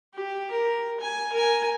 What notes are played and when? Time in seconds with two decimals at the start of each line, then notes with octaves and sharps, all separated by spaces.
0.14 G4
0.51 A#4
1.00 G#5
1.33 A#4 G#5